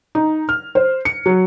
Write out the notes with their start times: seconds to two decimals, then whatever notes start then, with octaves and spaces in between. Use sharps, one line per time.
0.15 D#4
0.49 F6
0.75 C5
1.05 C#7
1.26 F#3